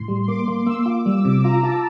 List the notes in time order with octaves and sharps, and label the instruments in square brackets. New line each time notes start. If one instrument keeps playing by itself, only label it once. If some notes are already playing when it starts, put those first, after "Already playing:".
Already playing: [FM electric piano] A2 [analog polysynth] C6
[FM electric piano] G3
[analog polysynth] C6
[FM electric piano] A#3 [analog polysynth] D6
[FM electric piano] A#3 [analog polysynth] D6
[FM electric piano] A#3 [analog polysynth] E6
[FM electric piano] F4 [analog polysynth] D6
[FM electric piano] G3 [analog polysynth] E6
[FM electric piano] C3 [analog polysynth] D6
[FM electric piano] F4 [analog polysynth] A#5
[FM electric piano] F4 [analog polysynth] A5